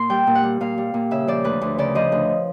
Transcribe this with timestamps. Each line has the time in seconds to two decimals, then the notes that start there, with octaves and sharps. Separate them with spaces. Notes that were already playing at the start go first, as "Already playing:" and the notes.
Already playing: A#2 C6
0.10 G3 G5
0.27 A#2
0.35 F#5
0.43 G3
0.61 A#2 F5
0.78 G3
0.94 A#2
1.11 C#3 E5
1.27 F3 D5
1.44 D2 B4
1.61 D2
1.78 C#3 D5
1.95 F3 D#5
2.12 D2